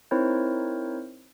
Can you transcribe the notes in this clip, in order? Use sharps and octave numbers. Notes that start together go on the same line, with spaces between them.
C4 D#4 E4 A#4 C5 C#5